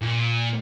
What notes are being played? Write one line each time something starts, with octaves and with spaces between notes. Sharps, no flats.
A#2